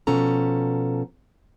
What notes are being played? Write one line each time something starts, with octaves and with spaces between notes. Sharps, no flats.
B2 F3 C#4 A4 A#5